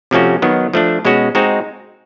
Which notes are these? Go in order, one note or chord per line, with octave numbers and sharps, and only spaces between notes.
C3 F3 A3 C#4 F#4
D#3 F#3 B3
F3 A3 D4
B2 G#3 C#4 F#4
G#3 C4 D#4 F#4